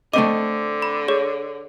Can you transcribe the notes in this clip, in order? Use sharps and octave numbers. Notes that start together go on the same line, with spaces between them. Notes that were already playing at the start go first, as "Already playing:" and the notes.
D3 A3 C4 D#5 D6
B5
G#4 C#5